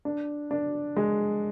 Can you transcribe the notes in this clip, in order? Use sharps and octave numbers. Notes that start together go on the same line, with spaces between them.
D4
D4
G#3